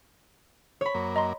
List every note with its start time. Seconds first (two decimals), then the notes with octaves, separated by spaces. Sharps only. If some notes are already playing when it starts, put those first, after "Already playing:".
0.81 C#5 B5
0.94 F#2 A#3
1.16 D#5 A#5 C6